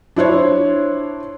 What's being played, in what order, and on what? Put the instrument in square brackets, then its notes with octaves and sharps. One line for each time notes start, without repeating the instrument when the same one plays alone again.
[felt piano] D4 E4 C5 C#5